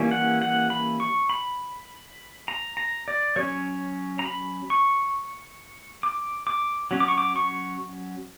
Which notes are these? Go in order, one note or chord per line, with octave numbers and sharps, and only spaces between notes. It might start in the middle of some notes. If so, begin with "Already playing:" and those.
Already playing: E3 G3 A#3 C#4
F#5
F#5
B5
C#6
B5
A#5
A#5
D5
F#3 C#4 C#5
A#5
B5
C#6
D6
D6
F#3 C#4
D6
C#6
D6
C#6